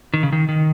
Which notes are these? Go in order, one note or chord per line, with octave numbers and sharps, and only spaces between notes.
D#3
C#3
D#3
D#3